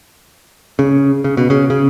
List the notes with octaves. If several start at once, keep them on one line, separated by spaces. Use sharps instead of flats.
C#3
C#3
B2
C#3
C#3